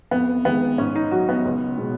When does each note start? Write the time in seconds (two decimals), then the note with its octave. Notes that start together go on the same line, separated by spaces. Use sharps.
0.11 F2 B3
0.45 D#3 G#3 B3
0.78 G#2 C#4
0.96 D#4
1.11 F#3 F#4
1.29 B3
1.45 C#2
1.78 B2 G#3